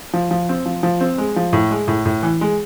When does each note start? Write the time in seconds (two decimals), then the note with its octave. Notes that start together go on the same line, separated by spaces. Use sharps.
0.13 F3
0.31 F3
0.49 C4
0.66 F3
0.83 F3
1.01 C4
1.18 G#3
1.36 F3
1.53 A2
1.71 G#3
1.88 A2
2.06 A2
2.23 E3
2.41 G#3